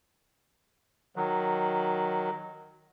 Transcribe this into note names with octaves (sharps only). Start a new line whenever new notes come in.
D#3 F#3